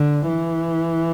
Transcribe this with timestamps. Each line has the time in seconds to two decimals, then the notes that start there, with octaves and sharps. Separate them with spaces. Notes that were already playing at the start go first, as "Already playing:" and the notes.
Already playing: D3
0.28 E3